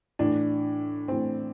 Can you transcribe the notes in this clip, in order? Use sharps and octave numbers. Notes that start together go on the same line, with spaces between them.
A2 E3 D4
A2 E3 C4